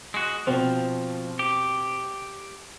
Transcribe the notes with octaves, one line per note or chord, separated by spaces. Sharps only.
G#3 F#4
B2 F3 C4
G4